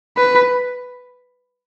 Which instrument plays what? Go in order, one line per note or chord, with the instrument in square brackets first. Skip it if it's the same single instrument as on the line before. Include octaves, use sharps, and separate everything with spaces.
[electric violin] B4